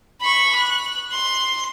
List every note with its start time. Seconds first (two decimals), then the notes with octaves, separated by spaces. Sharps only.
0.21 B5 C#6
0.55 F#6
1.12 C6